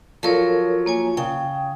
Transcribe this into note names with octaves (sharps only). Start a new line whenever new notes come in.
F3 F#3 A4 A#4 C#5
A#3 C#5 G#5
C#3 G5